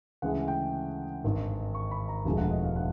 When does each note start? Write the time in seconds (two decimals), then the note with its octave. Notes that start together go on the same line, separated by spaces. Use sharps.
0.22 D2 C#3 E3 G#3 F#5
0.48 G5
1.24 G#1 G2 D#3
1.75 C#6
1.91 B5
2.08 A#5
2.25 E1 D2 D3 F3 G#3 G#5
2.38 F#5
2.51 D#5
2.63 F5
2.76 F#5